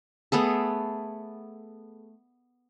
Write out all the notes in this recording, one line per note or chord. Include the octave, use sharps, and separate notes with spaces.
A3 B3 G#4 A4